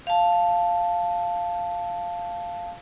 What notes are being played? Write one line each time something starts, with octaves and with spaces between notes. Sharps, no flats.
F5 A5